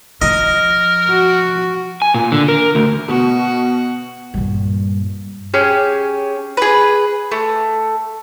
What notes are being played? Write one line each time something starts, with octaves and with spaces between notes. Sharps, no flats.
F3 A#4 D#5
F#4
G#5
A#2
D3
A#4
D2
B2 F#4
G2 A#2
C#4 G4 G#4
G#4 B4
A3